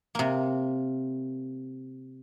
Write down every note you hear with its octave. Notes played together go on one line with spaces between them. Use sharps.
C3 A#3